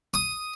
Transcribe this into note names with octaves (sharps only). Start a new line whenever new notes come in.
D#6